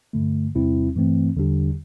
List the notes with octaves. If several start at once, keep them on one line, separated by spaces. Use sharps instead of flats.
G2 D3 A3
E2 C3 G3 C4 E4
G2 E3 A3 C4
E2 D3 G3 D4 G4